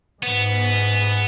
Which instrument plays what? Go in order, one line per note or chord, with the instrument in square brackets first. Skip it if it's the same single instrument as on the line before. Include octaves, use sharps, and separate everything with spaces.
[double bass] G#2 [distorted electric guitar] B3